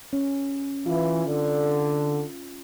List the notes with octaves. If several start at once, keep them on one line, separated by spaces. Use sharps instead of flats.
C#4
E3 F4
D3